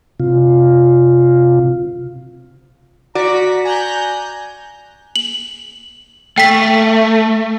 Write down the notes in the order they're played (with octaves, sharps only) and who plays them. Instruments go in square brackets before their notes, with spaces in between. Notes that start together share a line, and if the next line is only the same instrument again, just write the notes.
[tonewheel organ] C3 F4
[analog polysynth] F#4 B6 [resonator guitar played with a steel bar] D5 [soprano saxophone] A#5
[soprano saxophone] G#5 [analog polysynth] A#5 F#6 G6
[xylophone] F#7
[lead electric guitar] A3 [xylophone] G5 B6